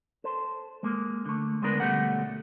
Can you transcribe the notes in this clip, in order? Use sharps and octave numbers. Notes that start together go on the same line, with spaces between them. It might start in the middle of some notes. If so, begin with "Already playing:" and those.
A4 C5
G#3 A#3
D3 A3
D3 G#3 B3 D4 A#4 B4
D2 B2 G3 A3 C#4 F#5